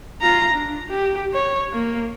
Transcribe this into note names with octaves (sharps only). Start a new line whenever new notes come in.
F4 A#5
D4
G4
C#5
A#3